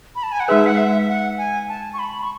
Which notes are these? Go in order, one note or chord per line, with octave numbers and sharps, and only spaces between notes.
B5
A5
G#5
F#5
G#3 D#4 G#4 B4 E5
F#5
E5
F#5
G#5
A5
C#6
B5
C#6